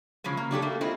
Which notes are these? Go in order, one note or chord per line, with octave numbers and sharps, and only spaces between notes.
C#3 F3 F#3 G#3
A#3
F#3 D4 G4 A4
A3 A#3
G#3 C4 E4 F4